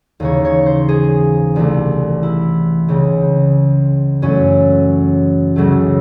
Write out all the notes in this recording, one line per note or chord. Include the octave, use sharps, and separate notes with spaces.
D#2 C#3 E3 C#5
C#5
C5
G#4
C2 C3 E3 A3
E4
C#2 C#3 G#3
F#2 E3 A3 C#4
C#2 C#3 F#3 A3